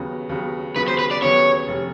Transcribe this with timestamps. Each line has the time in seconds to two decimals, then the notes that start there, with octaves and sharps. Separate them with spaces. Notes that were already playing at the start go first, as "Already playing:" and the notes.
Already playing: D#2 C#3 F#3 B3
0.29 D#2 C#3 F#3 B3
0.76 D#2 C#3 F#3 B3 B4
0.88 C5
0.99 B4
1.11 D5
1.22 D#2 C#3 F#3 B3 C#5
1.68 F1 C3